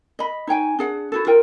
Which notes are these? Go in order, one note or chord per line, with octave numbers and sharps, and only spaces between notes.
D#5 B5
D#4 C#5 G5 G#5
D4 G#4 F#5
E4 F#4 A4
F4 A#4 G5